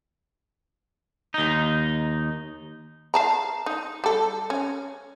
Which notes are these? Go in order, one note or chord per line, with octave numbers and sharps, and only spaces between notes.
D#2 D#4
F5 A5 A#5
D#4
G3 A4
C#4